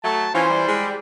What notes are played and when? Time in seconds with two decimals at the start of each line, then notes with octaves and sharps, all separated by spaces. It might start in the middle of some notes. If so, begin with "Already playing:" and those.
0.04 F#3 A3 A5
0.35 E3 C#4 E4 F4 C5
0.50 G3
0.68 G#3